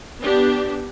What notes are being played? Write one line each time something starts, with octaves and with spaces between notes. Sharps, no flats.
B3 D4 G4